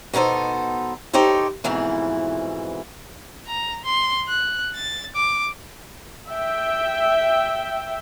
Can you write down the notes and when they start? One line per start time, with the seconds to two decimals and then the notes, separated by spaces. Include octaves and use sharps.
0.13 B2 B3 D#4 A4 C5
1.13 D#4 G4 A4 C5 C#5
1.64 F2 G#2 B2 E3 E4
3.47 A#5
3.85 C6
4.28 F#6
4.75 A6
5.16 D6
6.29 E5 G5